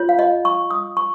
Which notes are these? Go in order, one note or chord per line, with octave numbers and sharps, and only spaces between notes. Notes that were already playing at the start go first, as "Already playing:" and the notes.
Already playing: F4 C#5
F5
D#5
C#6
D#6
C#6